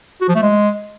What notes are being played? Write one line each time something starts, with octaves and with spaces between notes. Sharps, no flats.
F#4
F3
A3
G#3